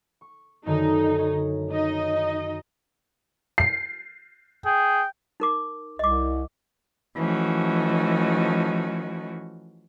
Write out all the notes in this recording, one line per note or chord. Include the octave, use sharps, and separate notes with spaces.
C#6
F#2 D3 D#3 D#4
C#5 A#5
D#4 D#5
C7
G#4 G5
D#4 A#4 D6
C2 D#5 D6
E3 F3 A3 C#4 D#4 F#4